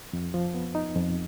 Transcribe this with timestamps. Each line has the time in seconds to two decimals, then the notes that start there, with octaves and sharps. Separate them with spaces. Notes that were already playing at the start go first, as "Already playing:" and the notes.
0.13 F2
0.34 F3
0.54 B3
0.75 D#4
0.95 F2